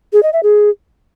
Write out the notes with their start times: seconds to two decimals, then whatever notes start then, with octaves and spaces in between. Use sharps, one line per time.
0.13 G#4
0.23 D#5
0.33 E5
0.43 G#4